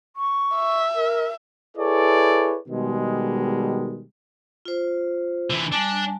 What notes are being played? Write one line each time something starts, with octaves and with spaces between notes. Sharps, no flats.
C#6
E5
A#4
E4 G#4 A4 B4 C#5 D5
B2 D#3 G3 G#3
F4 C5
D3 E3
G3 D4 G#5 A5